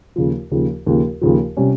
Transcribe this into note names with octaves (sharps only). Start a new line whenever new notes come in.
D#2 C#3 F3
D#2 C#3 F3
D#2 C#3 F3
D#2 C#3 F3
C3 G3 C#4